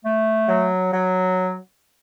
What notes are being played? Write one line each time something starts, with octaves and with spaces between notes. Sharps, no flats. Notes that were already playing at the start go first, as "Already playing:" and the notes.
A3
F#3
F#3